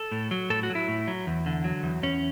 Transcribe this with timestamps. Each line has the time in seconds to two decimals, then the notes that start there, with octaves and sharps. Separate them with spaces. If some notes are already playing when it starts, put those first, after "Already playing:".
Already playing: A4
0.12 A2
0.31 F#3
0.50 A2 A4
0.63 F#4
0.70 F#3
0.75 E4
0.88 A2
1.08 F#3
1.27 E2
1.46 D3
1.64 F#3
1.83 E2
2.03 E2 C#4